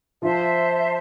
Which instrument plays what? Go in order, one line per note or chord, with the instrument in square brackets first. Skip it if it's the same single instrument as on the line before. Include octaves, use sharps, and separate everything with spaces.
[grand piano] F3 F4 [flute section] C5 E5 A5 C6